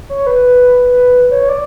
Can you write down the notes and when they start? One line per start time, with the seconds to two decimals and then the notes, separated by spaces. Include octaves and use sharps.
0.09 C#5
0.27 B4
1.31 C#5
1.49 D5